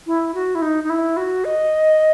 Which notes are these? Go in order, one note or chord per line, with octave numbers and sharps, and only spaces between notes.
E4
F#4
E4
D#4
D#4
E4
F#4
D#5